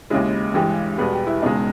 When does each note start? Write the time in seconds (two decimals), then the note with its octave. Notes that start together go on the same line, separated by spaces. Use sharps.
0.10 D#2 C#3 G#3 E4
0.54 G2 E3 G#3 G4
0.98 E2 B2 G3 B3 G#4
1.13 G4
1.27 E4
1.42 E1 E2 C#3 G#3 D#4